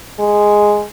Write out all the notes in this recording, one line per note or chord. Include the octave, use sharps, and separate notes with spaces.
G#3